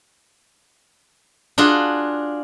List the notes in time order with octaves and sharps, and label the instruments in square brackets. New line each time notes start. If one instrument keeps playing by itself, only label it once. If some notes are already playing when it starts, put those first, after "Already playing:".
[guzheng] D4 F4 F#4 G#4